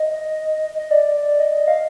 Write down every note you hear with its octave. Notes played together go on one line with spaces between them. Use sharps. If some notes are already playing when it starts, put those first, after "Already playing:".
Already playing: D#5
D#5
D#5
D5
D#5
F5